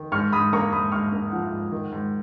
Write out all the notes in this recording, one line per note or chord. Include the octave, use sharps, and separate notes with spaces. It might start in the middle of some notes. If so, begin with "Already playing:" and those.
Already playing: D#3
G#2 C#6 F6
G#2 B5 D#6
A#3 A#5 C#6
G#2 B5 D#6
G#2 C#6 F6
A#3
F3 F#5
G#2
D#3
G#2